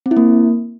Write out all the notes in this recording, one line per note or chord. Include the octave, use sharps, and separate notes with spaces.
C4
E4
A#3